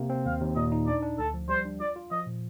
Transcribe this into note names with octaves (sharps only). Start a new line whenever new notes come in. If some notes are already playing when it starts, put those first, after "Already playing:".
Already playing: C3 A#3
C4
D#2 F5
D#2
A#2 D#5
D#4
D4 D5
D4
D2 A4
F3
G3 C5
D4
F4 D5
F4
F3 D#5
A#2